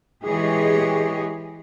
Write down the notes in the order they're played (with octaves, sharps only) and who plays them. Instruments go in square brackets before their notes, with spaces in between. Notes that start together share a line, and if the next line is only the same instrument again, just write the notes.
[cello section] E3 G#3 G4 G#4 C#5 D#5